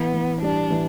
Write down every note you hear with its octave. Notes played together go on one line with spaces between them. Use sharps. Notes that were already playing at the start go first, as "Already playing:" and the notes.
Already playing: E3 B3
E3
G3 D4
E3